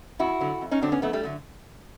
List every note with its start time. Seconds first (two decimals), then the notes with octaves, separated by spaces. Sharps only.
0.19 F2 E4 F#4
0.41 D3 F#3
0.61 F2
0.71 C#4 D#4
0.82 D3 F#3 C4 D4
0.92 B3 C#4
1.02 F2 A3 B3
1.13 G3 A3
1.23 D3 F#3